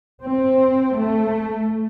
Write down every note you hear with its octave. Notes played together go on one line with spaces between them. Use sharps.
C4
A3